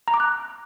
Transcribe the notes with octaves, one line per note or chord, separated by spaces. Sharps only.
A#5
D6
F#6